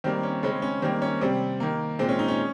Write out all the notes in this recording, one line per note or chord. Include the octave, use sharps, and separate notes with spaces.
D#3 G3 A#3 C4
C#4
C#3 G#3 C4 C#4
C#4
D#3 G3 A#3 C4
C#4
C3 G3 C4
D#3 A#3
A#2 G#3 C4
C#4
D#4
C#4